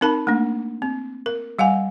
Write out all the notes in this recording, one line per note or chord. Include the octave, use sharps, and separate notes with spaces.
C4 D#4 A#4 A5 B5
A3 A#3 D4
C4
A#4
G3 F5 F#5 G#5